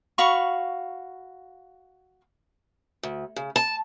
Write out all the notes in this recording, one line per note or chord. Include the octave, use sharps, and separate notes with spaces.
F#4 F5 B5 C#6
D2
C#3
A5